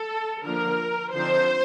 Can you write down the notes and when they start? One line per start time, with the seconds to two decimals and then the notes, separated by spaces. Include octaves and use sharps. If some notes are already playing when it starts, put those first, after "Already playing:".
Already playing: A4
0.44 D3 F3 A#3 A#4
1.13 D3 F3 C4 D#4 C5